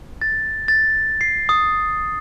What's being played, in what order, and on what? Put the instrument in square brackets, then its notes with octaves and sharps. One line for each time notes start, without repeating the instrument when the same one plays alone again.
[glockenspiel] A6
A6
C7
D#6